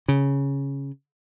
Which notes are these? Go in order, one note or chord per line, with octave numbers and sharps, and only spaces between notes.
C#3